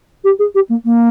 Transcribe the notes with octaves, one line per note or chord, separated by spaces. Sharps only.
G4
G#4
G4
A#3
A#3